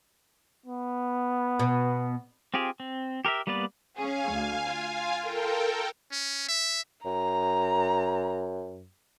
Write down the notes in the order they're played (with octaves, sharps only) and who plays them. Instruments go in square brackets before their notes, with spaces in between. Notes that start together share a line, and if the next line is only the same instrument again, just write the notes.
[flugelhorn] B3
[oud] B2
[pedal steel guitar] C4 F4 G4 G#4
C4
G4 A#4 C5 E5
G3 A#3 B3 B4 D5
[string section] C#4 G#4 [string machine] F5 G#5
[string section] D2
F4
[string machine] A4 A#4 G5
[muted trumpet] C#4
E5
[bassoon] F#2 [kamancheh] A#5